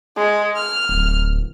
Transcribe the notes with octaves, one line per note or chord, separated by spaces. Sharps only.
G#3
F6
D1